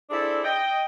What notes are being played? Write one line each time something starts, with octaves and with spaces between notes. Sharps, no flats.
C4 D4 E4 G#4 A4 D5
D#5 G5